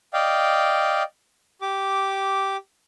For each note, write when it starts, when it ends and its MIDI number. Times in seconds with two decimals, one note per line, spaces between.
0.13 1.03 74
0.13 1.03 75
0.13 1.03 77
0.13 1.03 79
1.61 2.57 67
1.61 2.57 86